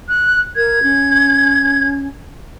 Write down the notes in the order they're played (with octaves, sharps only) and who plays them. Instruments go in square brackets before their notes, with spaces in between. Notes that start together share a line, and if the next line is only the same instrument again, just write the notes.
[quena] F#6
[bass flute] A#4 [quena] G#6
[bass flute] C#4